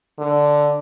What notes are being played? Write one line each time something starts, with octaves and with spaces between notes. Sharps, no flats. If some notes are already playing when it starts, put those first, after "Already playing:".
D3